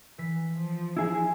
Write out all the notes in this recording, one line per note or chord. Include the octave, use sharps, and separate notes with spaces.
E3 B6
F3
D#4 E4 G#4